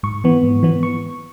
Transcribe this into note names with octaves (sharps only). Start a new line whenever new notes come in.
G#2 C#6
E3 B3
G#2
E3 B3
C#6